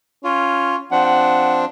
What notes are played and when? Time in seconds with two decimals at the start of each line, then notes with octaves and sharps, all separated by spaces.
0.24 C#4 F4
0.91 F3 C4 D4 F#5
1.05 F#5